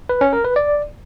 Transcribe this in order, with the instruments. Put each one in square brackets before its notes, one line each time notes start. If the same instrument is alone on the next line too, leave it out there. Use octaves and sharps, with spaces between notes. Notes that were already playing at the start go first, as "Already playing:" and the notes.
[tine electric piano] B4
C#4
A#4
B4
D5